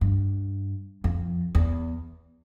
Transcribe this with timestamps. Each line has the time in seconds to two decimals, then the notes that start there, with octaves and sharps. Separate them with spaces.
0.01 G2
1.04 F2
1.55 E2